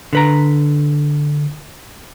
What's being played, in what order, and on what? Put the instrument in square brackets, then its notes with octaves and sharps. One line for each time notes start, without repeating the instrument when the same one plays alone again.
[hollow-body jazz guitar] D3 B4 A#5